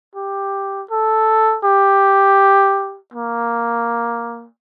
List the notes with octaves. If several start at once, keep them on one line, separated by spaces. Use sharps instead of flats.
G4
A4
G4
A#3